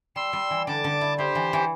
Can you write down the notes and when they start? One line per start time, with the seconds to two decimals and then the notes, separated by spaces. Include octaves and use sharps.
0.16 G3 C6 E6
0.33 G3
0.50 E3
0.67 D3 A5 D6
0.84 D3
1.01 E4
1.18 E4 G4 C5
1.35 E3
1.53 E3